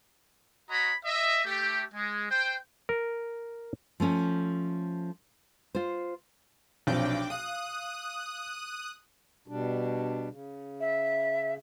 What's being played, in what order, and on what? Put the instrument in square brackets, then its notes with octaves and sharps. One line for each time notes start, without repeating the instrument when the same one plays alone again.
[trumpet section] F#4 C#5 D#5 A#5 B5
D#5 E5
A3 G4
G#3
C5 G5
[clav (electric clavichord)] A#4
[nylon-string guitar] F3 A3 C#4
F4 C5
[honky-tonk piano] B1 C3 F3 [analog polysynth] D4 G5 D6
[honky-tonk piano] F5 [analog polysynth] D#6 F#6
[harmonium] B2 G3 D4
C#3
[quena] E5